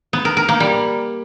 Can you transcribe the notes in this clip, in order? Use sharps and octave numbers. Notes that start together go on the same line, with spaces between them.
B3
A#4
A#4
A#3
G3